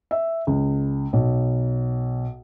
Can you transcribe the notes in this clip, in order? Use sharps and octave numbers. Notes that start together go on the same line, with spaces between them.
E5
C#2
B1